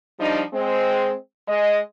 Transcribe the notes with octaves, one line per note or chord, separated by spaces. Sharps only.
F3 G3 D4 D#4
G#3 C4
G#3 D#5